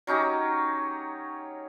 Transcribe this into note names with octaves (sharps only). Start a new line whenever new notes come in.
F#3 C#4 D#4 G4